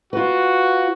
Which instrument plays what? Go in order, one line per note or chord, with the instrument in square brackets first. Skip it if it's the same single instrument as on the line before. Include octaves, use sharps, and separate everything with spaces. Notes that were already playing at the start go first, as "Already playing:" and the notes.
[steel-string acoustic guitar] F4 B4 [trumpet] F#4